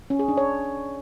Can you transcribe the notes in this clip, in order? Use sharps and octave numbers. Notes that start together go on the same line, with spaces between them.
C#4
G#4
D4
C#5